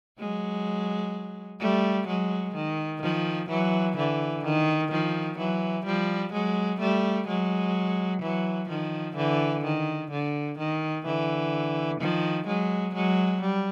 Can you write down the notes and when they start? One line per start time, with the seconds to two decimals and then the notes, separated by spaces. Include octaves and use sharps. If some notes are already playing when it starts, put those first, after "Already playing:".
0.19 F#3 G#3
1.60 G3 A3
2.07 F#3 G#3
2.55 D#3
3.02 D#3 F3
3.49 E3 F#3
3.97 D3 E3
4.45 D#3
4.92 D#3 F3
5.38 E3 F#3
5.85 F3 G3
6.33 F#3 G#3
6.80 G3 A3
7.28 F#3 G#3
8.22 E3 F#3
8.69 D#3 F3
9.16 D3 E3
9.64 D#3
10.11 D3
10.58 D#3
11.05 D3 E3
12.00 D#3 F3
12.47 F#3 G#3
12.95 F#3 G#3
13.42 G3